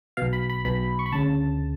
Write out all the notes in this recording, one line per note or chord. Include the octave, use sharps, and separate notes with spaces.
B1 B2 F5
B5
B5
B1 B2 B5
C#6
B5
D2 C#3 A5